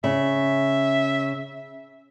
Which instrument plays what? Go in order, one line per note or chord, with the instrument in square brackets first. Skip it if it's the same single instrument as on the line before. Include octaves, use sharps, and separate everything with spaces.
[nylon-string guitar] C#3 [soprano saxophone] E5